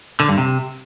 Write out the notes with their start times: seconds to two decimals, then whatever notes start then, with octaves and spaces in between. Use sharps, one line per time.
0.20 D3
0.29 G2
0.38 C3